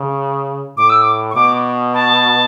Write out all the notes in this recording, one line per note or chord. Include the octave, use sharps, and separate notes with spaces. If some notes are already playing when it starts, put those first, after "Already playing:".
Already playing: C#3
A2 D6
E6
D6
C#6
B2 D6
A5